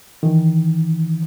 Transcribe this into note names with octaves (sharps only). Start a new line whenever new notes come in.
D#3 E3